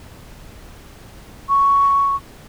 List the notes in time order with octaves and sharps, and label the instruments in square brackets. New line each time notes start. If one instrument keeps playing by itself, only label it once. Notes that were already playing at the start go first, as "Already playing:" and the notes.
[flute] C#6